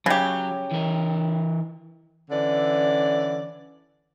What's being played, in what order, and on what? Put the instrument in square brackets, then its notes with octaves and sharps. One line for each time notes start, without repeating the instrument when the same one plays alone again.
[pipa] C#3 G4 [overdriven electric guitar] F#3 C#5
[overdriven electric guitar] E3 A#4
[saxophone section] D3 E3 C#4 D5